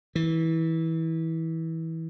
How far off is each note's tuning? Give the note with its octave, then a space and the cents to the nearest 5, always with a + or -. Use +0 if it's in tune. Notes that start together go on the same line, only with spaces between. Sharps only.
E3 -20